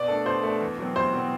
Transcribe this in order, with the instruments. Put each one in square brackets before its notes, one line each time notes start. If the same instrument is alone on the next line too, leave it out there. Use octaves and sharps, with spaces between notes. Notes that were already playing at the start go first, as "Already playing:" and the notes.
Already playing: [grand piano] B2 [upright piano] D5
[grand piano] A3 D4 A4
[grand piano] B2 [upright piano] C5
[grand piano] A3 D4 A4
E2
B2 F#3 C4
[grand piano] E2 [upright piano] C5
[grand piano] B2 F#3 C4